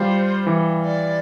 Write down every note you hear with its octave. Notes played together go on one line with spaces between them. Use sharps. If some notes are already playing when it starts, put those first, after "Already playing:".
Already playing: G3 F4 C5
E3
D5